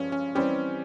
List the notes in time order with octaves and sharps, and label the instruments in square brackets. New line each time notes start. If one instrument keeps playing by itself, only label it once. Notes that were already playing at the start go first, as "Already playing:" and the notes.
Already playing: [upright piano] G2 F3 G#3 [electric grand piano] C#4
[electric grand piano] C#4
[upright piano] E3 G3 C4 G4 [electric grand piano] C#4